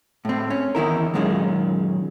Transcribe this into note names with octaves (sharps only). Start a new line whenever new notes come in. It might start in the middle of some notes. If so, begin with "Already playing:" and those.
A2 C4
C#4
E2 D#3 E4 A#4
F#2 A#2 D#3 G#3 C4 C#4